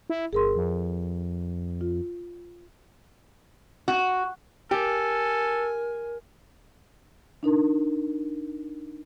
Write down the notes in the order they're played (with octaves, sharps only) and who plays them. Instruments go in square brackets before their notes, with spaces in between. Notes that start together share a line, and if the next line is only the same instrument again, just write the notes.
[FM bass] E4
[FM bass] G1 [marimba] G#4 A#4 C6
[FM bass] F2
[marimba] F4
[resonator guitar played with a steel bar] F#4
[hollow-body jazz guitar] G4 [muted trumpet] A4 [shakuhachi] A#4 [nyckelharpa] G#5
[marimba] D4 D#4 A#4